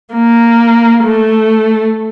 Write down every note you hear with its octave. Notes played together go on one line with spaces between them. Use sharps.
A#3
A3